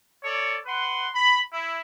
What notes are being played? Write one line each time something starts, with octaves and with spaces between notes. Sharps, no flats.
A4 C#5 D5
B4 F#5 C6
B5
E4